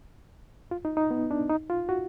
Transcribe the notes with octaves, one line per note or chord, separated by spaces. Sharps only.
F4
D#4
D#4
B3
D4
D#4
F4
F#4